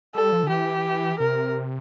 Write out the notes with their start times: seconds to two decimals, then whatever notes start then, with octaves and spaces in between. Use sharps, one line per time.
0.14 G3 A4
0.32 F3
0.43 D3
0.49 E3 G4
1.19 C3 A#4